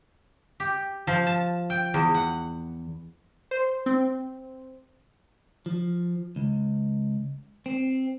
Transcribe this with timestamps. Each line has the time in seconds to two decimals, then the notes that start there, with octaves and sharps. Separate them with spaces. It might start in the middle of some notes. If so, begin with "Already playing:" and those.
0.60 G4
1.07 F3
1.27 A5
1.70 G5
1.94 E2
2.14 F#5
3.51 C5
3.86 C4
5.66 F3
6.36 C#2
7.66 C4